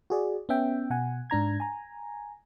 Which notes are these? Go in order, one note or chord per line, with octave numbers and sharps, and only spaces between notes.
F#4 G#4 D5
B3 C#4 E5 G5
B2 F#5 G#5
G#2 D4 A#5 G#6
G#5 A#5